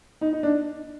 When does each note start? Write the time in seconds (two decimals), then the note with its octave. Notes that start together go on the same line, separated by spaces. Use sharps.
0.21 D#4
0.33 D#4
0.43 D4